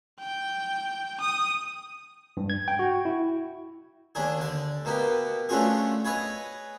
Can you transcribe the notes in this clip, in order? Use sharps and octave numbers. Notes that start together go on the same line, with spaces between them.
G5
D#6
G2
G#6
G5
F#4
E4
D#2 D4 G#4
D3 D5
B2 A#3 B3 G4
A3 C#4 D4 F4 F#4 G#4
G#4 B4 C#5 D#5